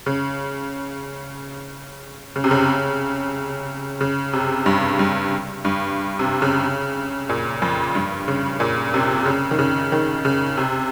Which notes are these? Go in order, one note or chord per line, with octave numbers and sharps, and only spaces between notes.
C#3
C#3
C3
C#3
C#3
C3
G2
G2
G2
C3
C#3
A#2
F2
G2
C#3
A#2
C3
C#3
D#3
C#3
D#3
C#3
C3